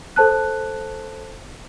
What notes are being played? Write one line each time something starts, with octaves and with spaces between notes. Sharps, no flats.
A4 C5 A5 F#6